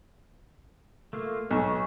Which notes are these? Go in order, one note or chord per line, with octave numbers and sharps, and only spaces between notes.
A3 A#3 F4
B1 C#5 A5 C#6